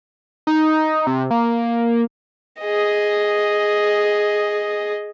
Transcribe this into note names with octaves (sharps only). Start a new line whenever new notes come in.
D#4
C3
A#3
G#4 D#5